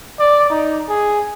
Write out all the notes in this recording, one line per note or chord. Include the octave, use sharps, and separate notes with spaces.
D5
D#4
G#4